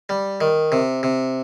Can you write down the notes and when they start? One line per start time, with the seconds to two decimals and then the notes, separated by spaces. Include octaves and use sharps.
0.09 G3
0.41 D#3
0.72 C3
1.03 C3